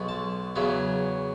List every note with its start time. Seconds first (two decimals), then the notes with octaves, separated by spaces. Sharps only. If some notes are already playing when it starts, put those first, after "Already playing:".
Already playing: B1 B2 G#3 B3
0.09 A5
0.56 E2 C#3 F#3 B3